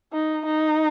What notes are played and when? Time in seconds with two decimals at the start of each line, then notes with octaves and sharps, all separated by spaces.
0.13 D#4
0.46 D#4